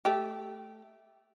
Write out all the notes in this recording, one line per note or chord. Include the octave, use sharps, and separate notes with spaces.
A3 G4